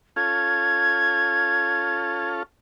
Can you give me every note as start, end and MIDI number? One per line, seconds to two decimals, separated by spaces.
0.16 2.43 61
0.16 2.43 65
0.16 2.43 69
0.16 2.29 92